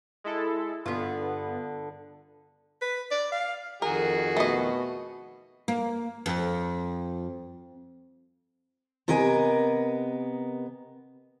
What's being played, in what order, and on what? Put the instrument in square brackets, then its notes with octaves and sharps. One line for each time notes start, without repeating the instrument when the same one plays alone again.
[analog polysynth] G#3 E4 A4
[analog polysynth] G2 B3 [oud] D3 F4
[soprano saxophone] B4
D5
F5
[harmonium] F2 D#3 [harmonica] F#4 G#4 [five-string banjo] A#4
[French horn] B2 [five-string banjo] A3 D#5
[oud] A#3
F2
[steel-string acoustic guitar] C3 B3 A#4 D#5 G#5